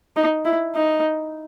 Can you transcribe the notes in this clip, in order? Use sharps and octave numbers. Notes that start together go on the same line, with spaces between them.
D#4
E4
D#4